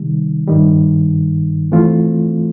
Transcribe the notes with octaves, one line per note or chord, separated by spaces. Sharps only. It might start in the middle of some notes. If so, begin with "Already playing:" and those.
Already playing: C3 D#3 G3
G2 D#3 G3
E3 A3 C4 F4